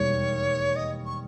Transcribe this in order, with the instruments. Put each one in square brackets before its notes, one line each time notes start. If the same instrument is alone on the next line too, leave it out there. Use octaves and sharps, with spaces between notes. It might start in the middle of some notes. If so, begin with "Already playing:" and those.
Already playing: [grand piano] E1 D#2 D#3 G3 [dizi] C#5
[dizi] D#5
C#6